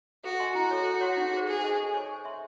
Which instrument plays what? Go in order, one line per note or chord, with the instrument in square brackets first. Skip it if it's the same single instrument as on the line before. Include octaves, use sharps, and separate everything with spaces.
[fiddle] F#4 [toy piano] A4
[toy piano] D#5 G#5 C6
[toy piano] E4 [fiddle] F#4
[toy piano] A4 C#5
A4
C#5 F#5 C6
D#4
G#4 C5
[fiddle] G#4 [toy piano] A4
[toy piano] C5 D#5 G#5 C#6
A4
C#5 G#5 C#6
C5
E5 C6